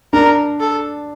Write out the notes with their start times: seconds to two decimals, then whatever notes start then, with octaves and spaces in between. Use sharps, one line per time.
0.13 D4 A#4
0.60 A4